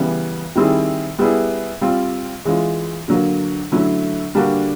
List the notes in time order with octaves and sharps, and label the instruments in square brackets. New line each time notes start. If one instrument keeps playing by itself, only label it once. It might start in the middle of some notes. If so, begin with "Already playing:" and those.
Already playing: [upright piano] C#3 E3 G3 B3
D#3 G3 C4 E4 G#4
G3 B3 E4 G#4
G3 C4 F4
E3 G#3 C#4 F4
D3 F#3 A#3
D3 F#3 A3 C#4 E4
D3 G3 A#3 D4 F#4